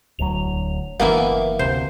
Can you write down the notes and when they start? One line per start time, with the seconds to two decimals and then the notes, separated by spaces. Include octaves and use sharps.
0.19 D1 D2 F#3 F7
1.00 F#1 E3 A#3 B3 E5 F5
1.59 D2 C3 C5